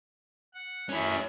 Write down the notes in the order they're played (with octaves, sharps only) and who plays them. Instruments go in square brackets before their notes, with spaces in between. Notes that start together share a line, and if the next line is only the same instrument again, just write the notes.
[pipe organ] F#5
[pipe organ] F#2 [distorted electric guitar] C#4 E4